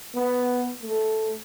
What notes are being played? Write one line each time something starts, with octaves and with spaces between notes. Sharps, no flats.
B3
A3